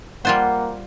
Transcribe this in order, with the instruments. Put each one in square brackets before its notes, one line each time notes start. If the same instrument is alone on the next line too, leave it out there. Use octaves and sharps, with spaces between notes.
[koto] G3 F4 C5 [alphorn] A#3 [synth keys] F#5